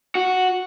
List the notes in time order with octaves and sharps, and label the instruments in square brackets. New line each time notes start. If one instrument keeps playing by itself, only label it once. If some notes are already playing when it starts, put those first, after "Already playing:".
[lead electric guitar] F#4